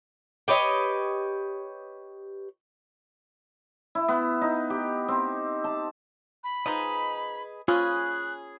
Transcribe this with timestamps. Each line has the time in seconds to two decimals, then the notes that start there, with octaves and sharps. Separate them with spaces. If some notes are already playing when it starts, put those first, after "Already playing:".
0.48 G4 B4 C#5 D#5
3.95 E4
4.08 B3
4.41 D#4
4.70 G4
5.08 C4
5.64 A5
6.44 B5
6.66 F3 G#3 D#4 G#4 B4 D#5
7.68 C#4 F4 G#4 B5 D#6 F#6